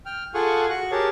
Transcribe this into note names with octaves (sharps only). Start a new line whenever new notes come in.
G5 F6
F4 G#4 A4 F#5 G#5 C#6
F#4 C#6 F#6
G4 G#4 A#4 C#5 A5